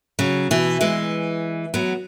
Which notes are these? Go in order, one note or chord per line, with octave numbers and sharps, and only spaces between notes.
C#3 F#3
B2 E3
E3 G#3
F#3 B3